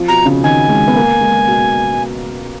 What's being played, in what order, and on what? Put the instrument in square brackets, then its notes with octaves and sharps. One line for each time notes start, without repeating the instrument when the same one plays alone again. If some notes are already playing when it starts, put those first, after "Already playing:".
Already playing: [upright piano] F3
[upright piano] B2 [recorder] A#5
[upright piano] C#3
[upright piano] D#3 [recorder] G#5
[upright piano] G#3
B3
A#3
G#3
B2